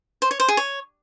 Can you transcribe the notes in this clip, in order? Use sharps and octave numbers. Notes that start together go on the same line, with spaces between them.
C5
C#5
C5
G#4
C#5